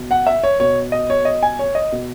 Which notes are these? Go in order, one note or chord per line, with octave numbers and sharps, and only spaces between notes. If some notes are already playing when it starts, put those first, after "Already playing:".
Already playing: B2
F#5
E5
C#5
B2 C#5
D#5
C#5
D#5
G#5
C#5
D#5
B2